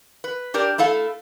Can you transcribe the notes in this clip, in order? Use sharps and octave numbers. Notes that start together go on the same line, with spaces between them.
B4
D4 G4 A#4 D5
A3 E4 A4 F5